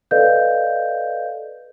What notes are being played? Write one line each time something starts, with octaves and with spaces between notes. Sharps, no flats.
A4 B4 D5 D#5 F5 G6